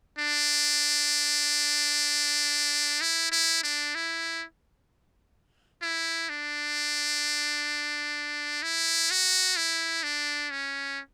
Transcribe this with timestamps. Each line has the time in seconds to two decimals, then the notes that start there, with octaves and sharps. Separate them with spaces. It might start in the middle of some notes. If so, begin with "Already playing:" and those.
0.19 D4
3.01 E4
3.32 E4
3.63 D4
3.95 E4
5.82 E4
6.29 D4
8.63 E4
9.11 F#4
9.57 E4
10.03 D4
10.51 C#4